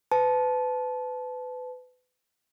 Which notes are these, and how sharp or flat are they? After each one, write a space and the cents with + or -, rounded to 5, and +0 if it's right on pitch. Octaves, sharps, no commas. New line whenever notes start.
B4 +30 A5 -20